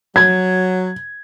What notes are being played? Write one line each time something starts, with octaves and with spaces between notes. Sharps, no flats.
F#3 G#6